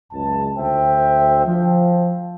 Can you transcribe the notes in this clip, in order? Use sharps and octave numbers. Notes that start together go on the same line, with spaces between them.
C#2 F#2 A5
D2 C5 E5 G5
F3